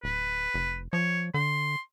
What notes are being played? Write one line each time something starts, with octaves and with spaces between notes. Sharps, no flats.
D1 B4
F1
F3 C#5
D3 C6